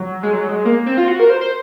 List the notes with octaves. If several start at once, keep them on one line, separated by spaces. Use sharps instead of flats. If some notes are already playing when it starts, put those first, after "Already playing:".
Already playing: F#3
G#3
F#3
G#3
A#3
C4
F4
F#4
A#4
C5
C5